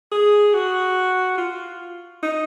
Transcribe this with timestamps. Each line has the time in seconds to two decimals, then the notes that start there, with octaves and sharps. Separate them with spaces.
0.12 G#4
0.54 F#4
1.38 F4
2.23 D#4